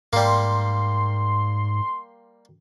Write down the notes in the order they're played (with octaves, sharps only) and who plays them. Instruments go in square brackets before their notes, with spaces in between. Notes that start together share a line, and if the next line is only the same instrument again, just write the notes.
[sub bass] G#2 [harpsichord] G3 A#3 [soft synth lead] C6